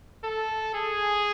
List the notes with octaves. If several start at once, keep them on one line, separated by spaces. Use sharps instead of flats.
A4
G#4